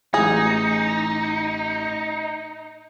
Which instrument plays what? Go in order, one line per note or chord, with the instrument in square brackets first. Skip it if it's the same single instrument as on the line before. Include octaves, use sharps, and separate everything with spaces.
[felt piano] A1 E3 D#6 [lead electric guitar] D#4 [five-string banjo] G#4